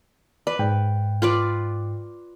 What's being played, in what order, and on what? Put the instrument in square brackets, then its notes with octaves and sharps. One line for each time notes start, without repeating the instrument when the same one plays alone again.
[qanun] B4 [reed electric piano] D5
[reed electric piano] G#2 G5
[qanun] F4 B4 D5